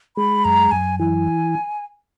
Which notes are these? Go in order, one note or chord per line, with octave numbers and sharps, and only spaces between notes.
G#3 B5
F#2 A#5
F#2 G#5
E3 G#5